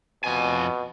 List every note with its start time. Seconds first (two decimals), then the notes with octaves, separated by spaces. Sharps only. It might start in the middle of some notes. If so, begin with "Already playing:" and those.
0.24 F2 B2 G#5